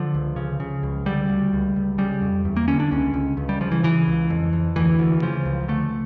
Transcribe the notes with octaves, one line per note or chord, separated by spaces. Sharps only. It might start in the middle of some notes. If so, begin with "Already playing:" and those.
Already playing: D3 F3
C#2
C#3
C#3
C#2
D3 G3
D2
C#2
C#2
C#3 G3
F2
E2
A#3
D3 C#4
D4
C#2 C#4
C#2
C#2
G3
C#3 F3
E3
C#3 E3
C#2
F2
F2
D2 E3
D2
C#3 F3
C#2
D3 A3